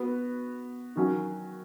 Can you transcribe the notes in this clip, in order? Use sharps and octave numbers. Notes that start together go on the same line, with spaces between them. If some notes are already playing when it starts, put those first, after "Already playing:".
Already playing: B3 F#4 B4
D#3 F#3 C#4 F#4